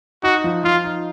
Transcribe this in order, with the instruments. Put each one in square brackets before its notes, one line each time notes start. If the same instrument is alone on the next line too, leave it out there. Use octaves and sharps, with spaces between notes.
[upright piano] D#4 [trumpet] F#4
[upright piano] F3
[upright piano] F3 [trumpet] F4
[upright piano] D#4